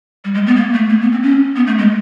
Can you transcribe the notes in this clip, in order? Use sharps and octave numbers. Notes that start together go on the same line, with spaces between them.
G3
G#3
B3
A#3
A3
A#3
B3
C4
C#4
B3
A3
G#3